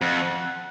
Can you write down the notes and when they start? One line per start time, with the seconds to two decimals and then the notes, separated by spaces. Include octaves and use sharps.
0.01 F2 F#5